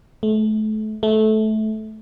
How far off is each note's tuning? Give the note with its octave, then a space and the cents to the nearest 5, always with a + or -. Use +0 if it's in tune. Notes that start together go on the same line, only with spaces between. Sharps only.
A3 -30
A3 -20